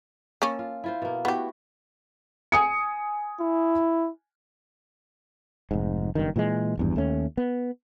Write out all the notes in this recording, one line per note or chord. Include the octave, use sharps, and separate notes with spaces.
A#3 C#4 A4
F4
E4 F4 C5
B2 A#3
A3 B3 E4 F#4 G4
G#5 D#6 C#7
E4
F1 G#2
F#1 G2 D#3
A#2 E3 F#3 G#3
G#1 E2 G2
D#2 A3 C#4
B3